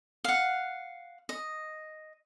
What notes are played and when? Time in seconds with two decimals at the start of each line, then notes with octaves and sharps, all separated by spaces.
0.24 F5 F#5
1.29 D#5